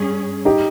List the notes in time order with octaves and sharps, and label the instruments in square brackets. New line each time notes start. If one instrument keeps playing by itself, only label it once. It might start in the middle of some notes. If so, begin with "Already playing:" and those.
Already playing: [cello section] G2 G3 C#4 G#4
[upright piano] D#4 G4